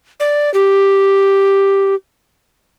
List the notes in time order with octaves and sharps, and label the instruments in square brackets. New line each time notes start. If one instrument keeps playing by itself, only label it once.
[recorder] D5
G4